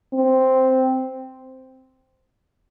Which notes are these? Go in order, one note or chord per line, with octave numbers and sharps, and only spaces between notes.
C4